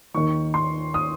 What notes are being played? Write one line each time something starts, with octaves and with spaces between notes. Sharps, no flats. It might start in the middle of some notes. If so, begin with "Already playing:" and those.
D#2 D#3 C#6
C6
D#6